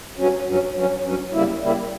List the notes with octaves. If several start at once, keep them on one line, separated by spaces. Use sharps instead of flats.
G2 F#3 C#4
G2 F#3 C#4
G2 F#3 C#4
G2 F#3 C#4
C#3 G3 A#3 E4
C#3 G3 A#3 E4